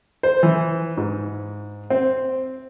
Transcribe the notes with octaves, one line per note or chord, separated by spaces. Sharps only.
C5
E3
G#2
C4